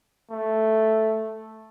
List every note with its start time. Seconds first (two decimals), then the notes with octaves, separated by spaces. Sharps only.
0.31 A3